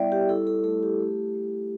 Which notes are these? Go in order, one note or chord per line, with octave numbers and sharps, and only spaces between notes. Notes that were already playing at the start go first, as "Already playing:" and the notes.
Already playing: G3 B3 E4 D5 E5 G5
G4
E4 A4
A4
A3 A4
G4
A3
A3